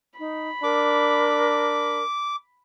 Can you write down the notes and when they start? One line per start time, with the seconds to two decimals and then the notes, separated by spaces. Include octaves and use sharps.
0.19 D#4 B5
0.63 D4 A#4 D6